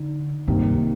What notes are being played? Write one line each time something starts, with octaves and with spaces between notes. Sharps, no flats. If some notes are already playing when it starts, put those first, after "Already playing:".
Already playing: D3 D#4
G2 C3 D#3 A#3